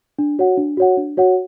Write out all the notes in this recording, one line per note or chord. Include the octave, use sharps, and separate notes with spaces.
D4
F#4 C#5 F#5
D4
F#4 C#5 F#5
D4
F#4 C#5 F#5